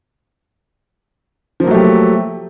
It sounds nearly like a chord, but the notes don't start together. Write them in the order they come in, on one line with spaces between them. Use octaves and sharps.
F3 A#3 F#3 A3 G4